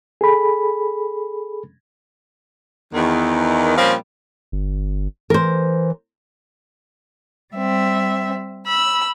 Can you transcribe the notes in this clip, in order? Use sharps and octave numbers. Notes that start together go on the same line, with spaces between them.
G#4 A4 B5
E2 D#3
A#2 F3 G3 C4 C#4 F4
G1
E3 A#4 C5
G3 C4 E5
B5 E6